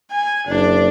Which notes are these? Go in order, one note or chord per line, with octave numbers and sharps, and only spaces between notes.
G#5
F#1 D4